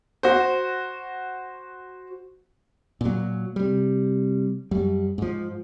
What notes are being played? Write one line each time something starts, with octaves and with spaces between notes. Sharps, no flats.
F#4 C5
A#2 F#3
C3 G3
F#2 G3
G#2 F3